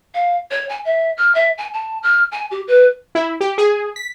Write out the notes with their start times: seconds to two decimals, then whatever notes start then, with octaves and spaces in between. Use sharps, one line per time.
0.14 F5
0.51 C#5
0.69 G#5
0.85 E5
1.17 F6
1.35 E5
1.58 G#5
1.74 A5
2.03 F6
2.32 G#5
2.51 G4
2.68 B4
3.15 E4
3.41 G4
3.58 G#4
3.96 B6